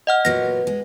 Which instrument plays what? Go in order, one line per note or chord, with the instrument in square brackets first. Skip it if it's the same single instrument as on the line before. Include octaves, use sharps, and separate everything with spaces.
[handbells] D#5 F#5 F6
[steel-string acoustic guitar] A#2 F#3 B3 [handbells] A#6
[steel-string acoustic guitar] G#3